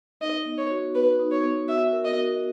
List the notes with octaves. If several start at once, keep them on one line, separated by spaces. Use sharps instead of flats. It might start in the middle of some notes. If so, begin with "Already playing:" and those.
D#4 D#5
B3
C#5
F#4
B3 B4
D#4
C#5
B3
F#4 E5
A#4
D#5
F#4